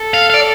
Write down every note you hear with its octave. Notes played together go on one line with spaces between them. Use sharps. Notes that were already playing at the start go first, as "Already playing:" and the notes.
Already playing: A4
F5
F5
D5